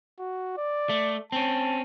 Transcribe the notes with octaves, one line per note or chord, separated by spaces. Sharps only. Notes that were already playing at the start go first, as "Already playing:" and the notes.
F#4
D5
A3
C4 C#4 A5